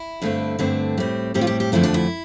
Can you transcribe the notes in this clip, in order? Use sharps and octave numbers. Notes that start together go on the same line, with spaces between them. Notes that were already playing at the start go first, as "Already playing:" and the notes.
Already playing: E4
G2 D3 A3 C4
G2 D3 A3 C4
A2 G3 C4
A2 G3 C4 G4
F4
G4
G4
F2 D3 F3 A3 C4 E4
D4
E4